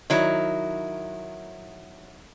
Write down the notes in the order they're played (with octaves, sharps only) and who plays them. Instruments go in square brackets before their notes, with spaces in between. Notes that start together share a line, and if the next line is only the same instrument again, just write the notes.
[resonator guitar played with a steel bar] D#3 F#3 E4